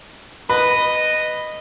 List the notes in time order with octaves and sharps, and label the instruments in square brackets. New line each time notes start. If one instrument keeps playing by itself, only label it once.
[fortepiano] B4 [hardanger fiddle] D#5